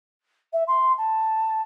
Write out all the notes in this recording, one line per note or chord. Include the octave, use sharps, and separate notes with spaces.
E5
C6
A5